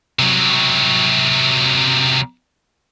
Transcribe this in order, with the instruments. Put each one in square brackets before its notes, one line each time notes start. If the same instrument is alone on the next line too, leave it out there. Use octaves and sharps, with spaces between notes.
[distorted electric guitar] C3 F#3